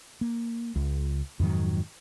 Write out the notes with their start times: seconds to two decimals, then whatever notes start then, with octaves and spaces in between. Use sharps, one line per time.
0.21 A#3
0.75 C#2
1.40 F2 G#2 D#3 F#3